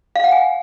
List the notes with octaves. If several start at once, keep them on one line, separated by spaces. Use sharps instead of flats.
F5
F#5
G#5